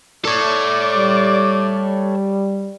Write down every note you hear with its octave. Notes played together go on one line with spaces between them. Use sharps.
A4 C#5 D5
G3